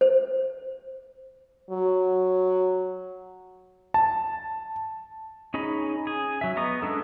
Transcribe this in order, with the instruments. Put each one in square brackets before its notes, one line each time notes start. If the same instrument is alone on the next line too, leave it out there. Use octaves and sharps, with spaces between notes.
[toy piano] C5
[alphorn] F#3
[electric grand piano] A5
[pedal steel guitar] C#4 D#4 G#4 D#5 B5
G#4
F#3 E5
B3 D#5 A#5 C#6 D#6
G#3 C#4 D4 A4